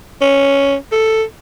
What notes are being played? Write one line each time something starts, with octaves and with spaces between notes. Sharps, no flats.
C#4
A4